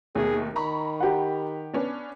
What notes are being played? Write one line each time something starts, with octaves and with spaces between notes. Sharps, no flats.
D#2 B2 A3 G#4
D#3 A#5 B5 C#6
G4 F#5
B3 C#4 D4